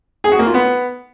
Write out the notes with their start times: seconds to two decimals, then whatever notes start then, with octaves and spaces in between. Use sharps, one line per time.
0.24 G#4
0.32 F#4
0.39 A#3
0.47 F4
0.54 B3